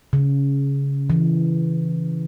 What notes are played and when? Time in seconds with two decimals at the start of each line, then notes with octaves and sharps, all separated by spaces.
0.13 C#3
1.10 E3